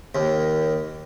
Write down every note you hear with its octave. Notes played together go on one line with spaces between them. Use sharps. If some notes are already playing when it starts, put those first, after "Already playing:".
D#2